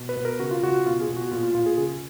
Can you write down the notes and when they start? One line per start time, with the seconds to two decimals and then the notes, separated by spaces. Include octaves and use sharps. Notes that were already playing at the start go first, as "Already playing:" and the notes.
Already playing: B2
0.09 B4
0.17 B2
0.25 A#4
0.40 C#3 F#4
0.51 F4
0.63 C#3 F#4
0.86 B2 F4
1.01 G#4
1.08 B2
1.17 F#4
1.31 A#2 F4
1.43 F4
1.54 A#2 F4
1.66 G#4
1.77 C#3 G#4